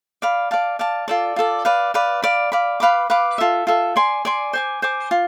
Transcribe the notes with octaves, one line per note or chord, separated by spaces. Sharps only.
D5 F5 B5
D5 F5 A5
D5 F5 A5
F4 A4 D5
F4 A4 D5
B4 D5 F5
B4 D5 F5
D5 F5 B5
D5 F5 B5
B4 F5 B5 D6
B4 F5 B5 D6
F4 A4 E5
F4 A4 E5
D5 G#5 C6
D5 G#5 C6
C5 G#5 D6
C5 G#5 D6
F4